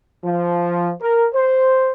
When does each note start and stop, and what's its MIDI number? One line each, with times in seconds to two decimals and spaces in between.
0.24 0.92 53
1.01 1.27 70
1.34 1.92 72